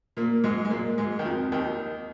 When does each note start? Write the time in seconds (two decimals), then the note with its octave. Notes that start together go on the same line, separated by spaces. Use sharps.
0.17 A#2 A#3
0.44 G#2 G#3
0.65 G#3
0.71 A#2 A#3
0.98 G#2 G#3
1.19 D#3
1.25 F2 F3
1.52 D#2 D#3